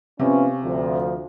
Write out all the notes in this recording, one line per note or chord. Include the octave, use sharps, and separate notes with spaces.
C3 F3 B3 C#4
D2 F3